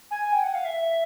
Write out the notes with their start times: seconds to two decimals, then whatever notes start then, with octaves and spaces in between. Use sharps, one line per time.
0.11 G#5
0.32 G5
0.43 F#5
0.55 F5
0.65 E5